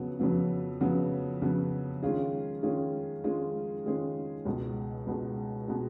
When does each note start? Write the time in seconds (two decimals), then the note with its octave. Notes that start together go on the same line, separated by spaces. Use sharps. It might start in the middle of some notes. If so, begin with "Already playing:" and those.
Already playing: F2 C#3 F#3 B3
0.20 F2 C#3 F#3 B3
0.81 F2 C#3 F#3 B3
1.42 F2 C#3 F#3 B3
2.03 D#3 G#3 C#4 F4 G#4
2.63 D#3 G#3 C#4 F4 G#4
3.24 D#3 G#3 C#4 F4 G#4
3.86 D#3 G#3 C#4 F4 G#4
4.45 C#2 B2 G#3
5.07 C#2 B2 G#3
5.68 B2 G#3